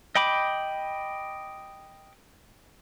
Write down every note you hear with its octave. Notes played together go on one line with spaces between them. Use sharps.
D#5 G5 B5 D6